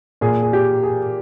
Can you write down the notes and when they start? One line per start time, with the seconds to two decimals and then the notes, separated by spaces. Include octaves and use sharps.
0.21 A#2 G#4
0.43 G#4
0.53 G4
0.84 G#4